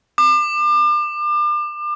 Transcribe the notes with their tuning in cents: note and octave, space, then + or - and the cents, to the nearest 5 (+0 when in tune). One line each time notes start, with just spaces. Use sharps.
D6 +35